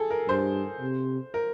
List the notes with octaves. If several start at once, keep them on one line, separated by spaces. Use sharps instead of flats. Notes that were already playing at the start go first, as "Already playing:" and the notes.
Already playing: G#4 A4
A#4
G2 C5
C3
A#4